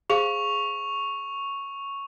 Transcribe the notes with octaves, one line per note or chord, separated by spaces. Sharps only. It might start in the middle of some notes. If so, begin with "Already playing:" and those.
G#4 C5 F5 C#6 F7